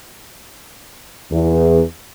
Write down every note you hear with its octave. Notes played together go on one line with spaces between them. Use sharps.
E2